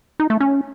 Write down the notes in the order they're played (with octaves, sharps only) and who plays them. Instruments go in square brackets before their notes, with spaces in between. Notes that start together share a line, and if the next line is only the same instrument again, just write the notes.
[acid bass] D#4
A3
C#4